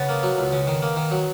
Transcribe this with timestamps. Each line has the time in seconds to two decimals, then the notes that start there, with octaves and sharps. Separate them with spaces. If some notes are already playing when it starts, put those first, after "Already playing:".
Already playing: C#3 B3
0.09 A#3
0.23 F#3
0.38 C#2
0.52 C#3
0.67 D#3
0.82 A#3
0.96 D#3
1.11 F#3